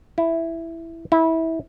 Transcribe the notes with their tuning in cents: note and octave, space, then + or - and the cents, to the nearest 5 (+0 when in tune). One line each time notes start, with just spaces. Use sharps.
E4 +5
E4 -20